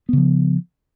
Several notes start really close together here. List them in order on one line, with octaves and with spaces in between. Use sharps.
B3 C#3 F3